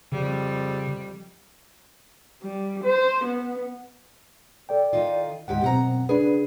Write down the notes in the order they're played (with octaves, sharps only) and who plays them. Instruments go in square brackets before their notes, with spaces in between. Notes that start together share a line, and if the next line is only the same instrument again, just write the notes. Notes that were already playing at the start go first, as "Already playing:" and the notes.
[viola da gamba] F2 G3 [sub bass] C#3
[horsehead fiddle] G3
C5
B3
[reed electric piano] A4 D5 G5
[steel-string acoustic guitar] D#3 D#4 F4
[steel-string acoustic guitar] D2 G#2 G4 [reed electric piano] F#5
[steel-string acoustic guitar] F#2 F#5 A#5 [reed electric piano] B2 C4
[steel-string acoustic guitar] C#3 G#4 [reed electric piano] D4 B4